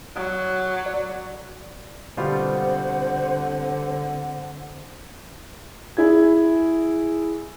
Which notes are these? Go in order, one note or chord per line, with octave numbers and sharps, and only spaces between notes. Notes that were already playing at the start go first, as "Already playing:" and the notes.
F#3
D5
B2 D3 G3 C4 F4 C5 F#5
E4 G#4 G#6